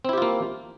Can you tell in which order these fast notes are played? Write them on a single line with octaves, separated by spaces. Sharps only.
C4 E4 G4 F4 A#3